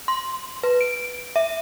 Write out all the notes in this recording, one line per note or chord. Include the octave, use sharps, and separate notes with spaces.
C6
B4
D7
E5